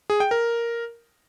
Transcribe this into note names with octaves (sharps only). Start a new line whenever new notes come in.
G#4
G5
A#4